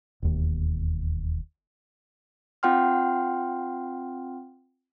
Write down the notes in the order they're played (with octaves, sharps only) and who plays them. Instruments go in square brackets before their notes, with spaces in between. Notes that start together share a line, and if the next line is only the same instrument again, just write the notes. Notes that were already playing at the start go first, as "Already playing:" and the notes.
[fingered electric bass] E1 D#2
[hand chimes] C4 F4 F#5 G5 C6 F6